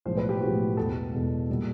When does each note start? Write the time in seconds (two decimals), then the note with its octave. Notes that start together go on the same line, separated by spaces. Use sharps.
0.05 B1 A2 F3 G#3 C5
0.17 B4
0.29 G4
0.41 B1 A2 F3 G#3 F#4
0.77 E2 B2 G#3 B3 A4
1.13 E2 B2 G#3 B3
1.49 A#2 G3 A#3